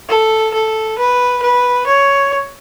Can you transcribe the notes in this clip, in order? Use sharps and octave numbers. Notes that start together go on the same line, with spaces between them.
A4
A4
B4
B4
C#5